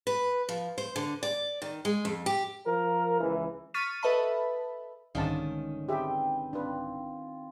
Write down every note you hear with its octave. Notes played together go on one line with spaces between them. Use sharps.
B4
F3
C5
D3
D5
D#3
G#3
F2
G4
F3 A#4
C#2 E3
C#6 F6 A6 B6 D#7
A4 B4 D#5 E5 A5 B5
C2 G#2 D3 D#3 C#4 F5 A5
C4 G4 G#4 B4 E5 G5
C4 D4 F4 B4